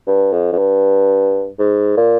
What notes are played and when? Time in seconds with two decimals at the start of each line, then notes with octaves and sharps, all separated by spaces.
0.07 G2
0.33 F2
0.53 F2
0.58 G2
1.59 G#2
1.97 A#2